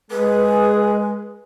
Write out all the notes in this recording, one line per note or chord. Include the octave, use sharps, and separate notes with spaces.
G#3 G#4 B4